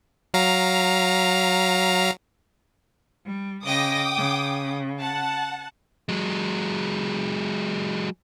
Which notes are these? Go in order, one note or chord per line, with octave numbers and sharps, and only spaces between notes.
F#3 F5 A#5
G3
C#3 D#5 G5 D6 D#6 A#6
C#3
F#5 A5
F#3 G#3